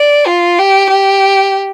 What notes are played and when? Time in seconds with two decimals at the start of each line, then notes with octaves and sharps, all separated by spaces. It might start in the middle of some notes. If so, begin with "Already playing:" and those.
Already playing: D5
0.26 F4
0.58 G4
0.90 G4